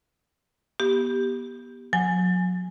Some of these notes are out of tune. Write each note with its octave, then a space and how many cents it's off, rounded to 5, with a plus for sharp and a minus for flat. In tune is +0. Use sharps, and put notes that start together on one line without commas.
B3 -30 G4 +0
F#3 -35 G#5 +0